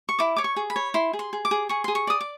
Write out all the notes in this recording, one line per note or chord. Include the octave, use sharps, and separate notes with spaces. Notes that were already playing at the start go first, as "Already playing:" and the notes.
C#6
E4 D6
C#5 D6
C#6
G#4
B5
C#5
E4 C6
G#4
C6
G#4
D6
G#4
G#4 C#6
G#4 C6
C#6
D5 D#6
D6